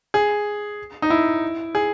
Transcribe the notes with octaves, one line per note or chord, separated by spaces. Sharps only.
G#4
D#4
E4
G#4